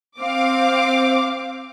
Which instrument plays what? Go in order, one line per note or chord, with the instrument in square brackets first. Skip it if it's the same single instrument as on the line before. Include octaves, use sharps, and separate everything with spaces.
[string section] C4 F5 D6